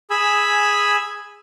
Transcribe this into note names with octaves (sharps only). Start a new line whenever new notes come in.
G#4 G#5 B5 E6